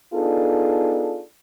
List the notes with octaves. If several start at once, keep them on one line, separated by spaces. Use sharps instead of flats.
B3 D4 D#4 F4 G#4 A4